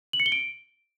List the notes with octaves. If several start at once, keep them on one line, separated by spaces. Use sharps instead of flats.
F#7
C#7
G7
D7